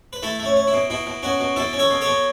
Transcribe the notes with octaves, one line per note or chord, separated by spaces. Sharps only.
B4
A3 E4 A4
A3
C#4
C#4
E4
B2
B2 E4
B2
B2 C#4 F#4
B2
B2 E4 A4
C#4
A4 C#5
B2
A4 C#5
B2